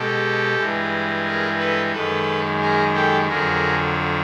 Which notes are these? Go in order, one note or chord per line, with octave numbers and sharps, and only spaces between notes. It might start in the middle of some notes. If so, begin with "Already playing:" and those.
Already playing: B2 G#3 G4 A4
G2 E3 G#3
G#4 A#4
A4 B4
F#2 D#3 G#3 A4 B4
G#4 A#4
G4 A4
F2 D3 F#3 G#4 A#4